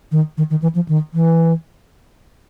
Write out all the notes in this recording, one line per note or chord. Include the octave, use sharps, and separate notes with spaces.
D#3
D#3
D#3
E3
F3
D#3
E3